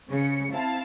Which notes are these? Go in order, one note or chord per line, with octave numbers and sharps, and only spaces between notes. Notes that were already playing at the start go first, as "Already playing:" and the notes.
C#3 C#7
C4 E4 F5 A5